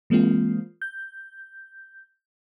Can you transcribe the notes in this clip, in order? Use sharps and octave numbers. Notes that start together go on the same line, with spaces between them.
E3 G#3 A#3 C4 F4
G6